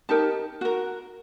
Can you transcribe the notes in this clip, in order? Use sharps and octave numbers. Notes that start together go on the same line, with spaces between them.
D#4 G4 A#4 A5
F#4 A#4